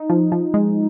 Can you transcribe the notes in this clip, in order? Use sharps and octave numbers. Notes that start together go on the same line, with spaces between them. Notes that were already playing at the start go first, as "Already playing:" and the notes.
Already playing: D#4
F3
F3
G#3